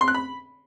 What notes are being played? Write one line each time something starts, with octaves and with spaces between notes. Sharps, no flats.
C6
F#6
B5